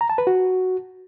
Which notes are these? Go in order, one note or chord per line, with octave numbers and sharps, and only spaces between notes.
A#5
A5
B4
F#4